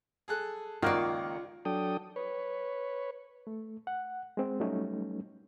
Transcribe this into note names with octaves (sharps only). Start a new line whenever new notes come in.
G#4 A4 F#6
C#2 D#3 A#3 F4 D5 F#5 C#6
F#3 D4 A4 G5 D#6
B4 C#5
A3
F#5
G#3 C4
F#3 G3 A3 C#4 D#4